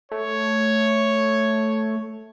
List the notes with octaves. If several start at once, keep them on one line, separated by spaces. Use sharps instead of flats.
A3 C#5